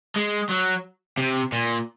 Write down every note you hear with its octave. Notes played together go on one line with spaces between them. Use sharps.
G#3
F#3
C3
A#2